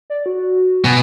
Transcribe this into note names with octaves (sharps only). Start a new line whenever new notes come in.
D5
F#4
B2 G#5